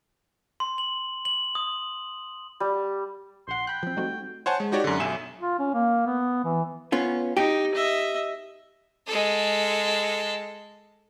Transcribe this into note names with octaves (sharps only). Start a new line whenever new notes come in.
C6
F#7
F#7
D#6
G3
A#1 F#5 C6
G5 B5 F#6
F3 C4
G3 A3 C4 D#4 F#4
C5 C#5 F#5 G#5 A5
G#3
D#4 F#4 G4 C#5 D5
F#2 D3
B1 E5 G#5 E7
F4
C#4
A#3
B3
E3
B3 C#4 F4
D#4 G4
D#5 E5
G#3 A4